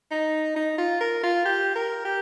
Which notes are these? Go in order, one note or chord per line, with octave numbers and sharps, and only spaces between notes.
D#4
D#4
F4
A#4
F4
G4
A#4
G4